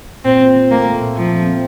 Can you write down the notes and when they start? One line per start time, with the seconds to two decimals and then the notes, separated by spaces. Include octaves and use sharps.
0.25 A#2 C4
0.41 C4
0.56 C4
0.71 A3 A#3
0.86 A3
1.02 A#2
1.16 A#2 F3
1.31 C4
1.46 C4